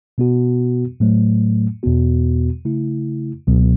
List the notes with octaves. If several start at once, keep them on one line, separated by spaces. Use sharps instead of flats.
B2 B3 F#4
A2 F#3 A3
E2 B2 B3 F#4
C#3 A3 E4
C#2 B2 F#3 B3